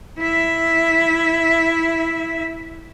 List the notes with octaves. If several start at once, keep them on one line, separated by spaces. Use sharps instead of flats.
E4 E5